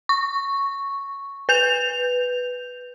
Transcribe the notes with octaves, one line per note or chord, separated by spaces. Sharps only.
C#6
B4 G6 F7